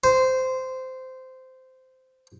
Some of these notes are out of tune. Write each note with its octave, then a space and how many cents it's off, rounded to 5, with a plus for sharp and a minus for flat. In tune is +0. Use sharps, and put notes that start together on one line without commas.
C5 -15